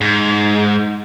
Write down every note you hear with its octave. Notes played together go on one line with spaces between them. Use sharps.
G#2